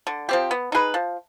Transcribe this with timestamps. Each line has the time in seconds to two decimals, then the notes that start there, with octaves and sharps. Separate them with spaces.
0.07 D3
0.29 F3 C4 G4
0.51 B3
0.72 D#4 G#4 B4
0.94 F3